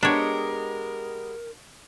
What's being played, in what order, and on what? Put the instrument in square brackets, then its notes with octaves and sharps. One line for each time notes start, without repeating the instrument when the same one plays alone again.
[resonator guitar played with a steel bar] G#3 B3 G4 [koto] D4 C#5 [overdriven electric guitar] A#4